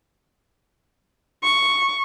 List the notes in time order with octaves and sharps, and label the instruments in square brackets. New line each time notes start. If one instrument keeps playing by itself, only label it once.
[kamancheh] C#6